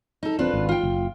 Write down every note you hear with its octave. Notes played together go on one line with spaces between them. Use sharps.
D#4 A4
D#1 C4 D4 F4 B4
G#1
F4 G5
F#1